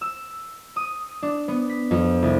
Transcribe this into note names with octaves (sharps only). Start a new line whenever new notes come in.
E6
D#6
D4
B3
B6
F2
C2